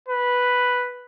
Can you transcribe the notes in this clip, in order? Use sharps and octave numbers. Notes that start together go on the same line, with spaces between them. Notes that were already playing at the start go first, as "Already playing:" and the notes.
B4